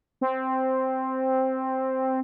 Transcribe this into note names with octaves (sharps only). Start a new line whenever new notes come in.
C4